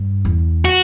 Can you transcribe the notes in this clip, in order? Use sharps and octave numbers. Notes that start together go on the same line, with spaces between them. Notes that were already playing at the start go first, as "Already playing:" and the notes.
Already playing: G2
E2
F#4